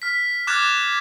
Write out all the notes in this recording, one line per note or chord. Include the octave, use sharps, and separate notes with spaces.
F6 B6
D6 F6 F#6 G#6 A6 E7